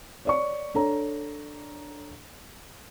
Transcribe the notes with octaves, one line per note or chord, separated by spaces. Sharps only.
C#5 D5 C#6
D4 A4 C#5 A#5